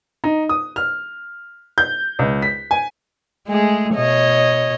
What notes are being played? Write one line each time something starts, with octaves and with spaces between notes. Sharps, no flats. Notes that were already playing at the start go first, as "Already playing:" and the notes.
D#4
D#6
F6
G6
C#2
B6
G#5
G#3 A3 G#4
B2 C#5 D#5